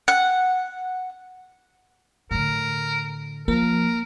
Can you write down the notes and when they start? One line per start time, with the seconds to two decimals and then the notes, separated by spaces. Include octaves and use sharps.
0.08 F#5
2.31 A2 D3 A#4
3.48 F3 A#3 A#4